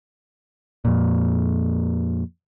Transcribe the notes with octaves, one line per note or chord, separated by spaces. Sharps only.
F2 A#2